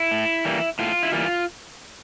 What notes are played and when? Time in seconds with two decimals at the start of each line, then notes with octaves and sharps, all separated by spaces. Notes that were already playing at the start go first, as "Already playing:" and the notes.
Already playing: E4
0.11 A2
0.45 E3 G3 A#3
0.79 A2 F4
1.03 E4
1.12 E3 G3 A#3 F4